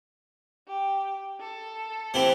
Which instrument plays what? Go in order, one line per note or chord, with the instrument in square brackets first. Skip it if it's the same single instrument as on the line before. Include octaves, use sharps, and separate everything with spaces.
[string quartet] G4
A4
[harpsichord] E3 C4 E4 G4 C5